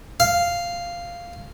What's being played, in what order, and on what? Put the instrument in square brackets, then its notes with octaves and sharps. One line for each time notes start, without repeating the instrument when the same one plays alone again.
[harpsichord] F5